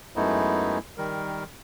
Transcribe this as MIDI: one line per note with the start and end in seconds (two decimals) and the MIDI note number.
0.16 0.78 42
0.16 0.78 56
0.16 0.78 57
0.16 0.78 59
0.16 0.78 63
0.16 0.78 64
0.98 1.44 51
0.98 1.44 55
0.98 1.44 70